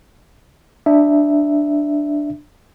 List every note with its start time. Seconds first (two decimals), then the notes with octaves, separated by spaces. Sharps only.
0.86 D4 E5